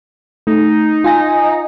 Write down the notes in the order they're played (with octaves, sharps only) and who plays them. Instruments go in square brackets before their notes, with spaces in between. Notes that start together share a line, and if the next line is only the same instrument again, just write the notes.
[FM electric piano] A3 [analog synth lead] D#4
[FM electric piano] F4 G#5 A#6